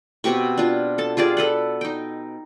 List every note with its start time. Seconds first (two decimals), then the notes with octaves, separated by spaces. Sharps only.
0.24 B2 C4 G4 C#6
0.58 D4 F4
0.98 A4 A5
1.17 F4 G4 G#4 D5
1.37 A4 B4 F#5
1.81 D#4 G5